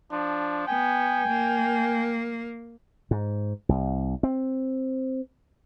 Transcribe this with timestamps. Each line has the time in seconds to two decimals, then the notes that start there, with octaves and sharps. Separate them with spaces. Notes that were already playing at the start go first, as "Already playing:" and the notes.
0.12 F3 D4
0.67 B3 G5 G#5
1.26 A#3
3.11 G#2
3.69 C2
4.23 C4